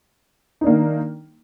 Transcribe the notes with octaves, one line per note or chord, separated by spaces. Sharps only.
D#3 A#3 D4 D#4